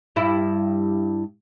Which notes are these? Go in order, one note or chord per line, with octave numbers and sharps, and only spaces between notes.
G2 E4